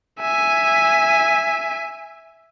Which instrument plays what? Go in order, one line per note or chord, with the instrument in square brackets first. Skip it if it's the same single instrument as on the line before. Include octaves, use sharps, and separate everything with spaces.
[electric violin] E5 G#5